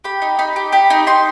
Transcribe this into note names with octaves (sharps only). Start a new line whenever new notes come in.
G4 B5
D#4
D#4 B5
G4
G4 B5
D#4
D#4 C6